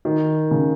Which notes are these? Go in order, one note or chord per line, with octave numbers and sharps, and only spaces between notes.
D#3
C#3